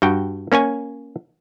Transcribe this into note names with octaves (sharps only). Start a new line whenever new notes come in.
G2 F#4 G5
A#3 C#4 C#5 G#5